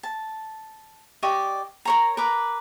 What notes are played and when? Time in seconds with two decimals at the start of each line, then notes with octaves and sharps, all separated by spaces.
0.03 A5
1.23 G4 D5 D#5 C#6
1.85 A#4 C#5 A#5
2.17 A#4 B4 D6